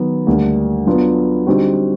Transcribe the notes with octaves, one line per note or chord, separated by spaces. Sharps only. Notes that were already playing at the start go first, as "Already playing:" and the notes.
Already playing: D#3 F#3 B3
D2 D3 G3 A#3 D4
F#3 B3 D4 F4
D3 G3 C4 D#4 F#4